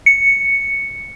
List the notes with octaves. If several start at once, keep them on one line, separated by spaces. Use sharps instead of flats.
C#7